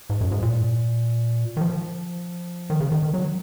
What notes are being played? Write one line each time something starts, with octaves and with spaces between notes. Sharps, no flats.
G#2
F#2
G#2
A#2
D#3
F3
D#3
C#3
D#3
D#3
F#3